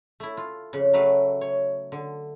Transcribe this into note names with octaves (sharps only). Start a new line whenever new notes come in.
A3 E4
F4
F2 C#3
F#3 A3 B4 F5
C#5
D3